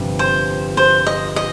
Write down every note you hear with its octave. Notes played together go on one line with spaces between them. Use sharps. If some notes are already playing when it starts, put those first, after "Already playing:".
Already playing: G1 F2 C3 G3
C5
C5
D#5
D#5